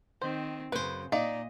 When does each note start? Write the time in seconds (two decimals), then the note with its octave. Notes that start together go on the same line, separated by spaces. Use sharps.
0.22 D#3 C4 C5
0.72 F#2 C#3 B4 C5
1.12 A#2 D#4 D5 D#5 F5